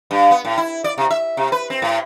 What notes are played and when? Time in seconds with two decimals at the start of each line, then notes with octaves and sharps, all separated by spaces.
0.11 G2
0.31 B3
0.45 A2
0.57 E4
0.84 D5
0.98 C3
1.11 E5
1.37 C3
1.52 B4
1.70 C4
1.82 A2